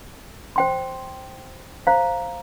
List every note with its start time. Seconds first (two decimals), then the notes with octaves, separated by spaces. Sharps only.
0.56 C5 G5 C6
1.87 C5 F5 A#5